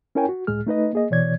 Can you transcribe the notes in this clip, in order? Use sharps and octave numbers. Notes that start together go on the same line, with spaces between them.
C#4 E4 A#4 C#5 G5 G#5
F#4
C#2 A2 G#3 G#4 F6
A3 D#4 B4 D#5
A#3 G#4 D#5
B2 E3 C#5 D5 G#6